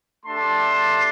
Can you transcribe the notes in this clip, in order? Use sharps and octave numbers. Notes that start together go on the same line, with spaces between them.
A3 D4 G4 A5 C6